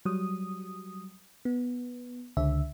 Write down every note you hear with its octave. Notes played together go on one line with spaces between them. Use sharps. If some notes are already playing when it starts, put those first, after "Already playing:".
F#3 G3 D#6
B3
C#2 D3 E5